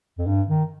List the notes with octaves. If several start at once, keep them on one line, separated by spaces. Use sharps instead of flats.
F2
G2
D#3